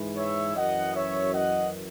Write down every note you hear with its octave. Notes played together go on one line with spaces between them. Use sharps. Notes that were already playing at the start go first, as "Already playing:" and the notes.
Already playing: G#2 E3
C#5 E5
F#2 E3 D#5 F#5
C#5 E5
D#5 F#5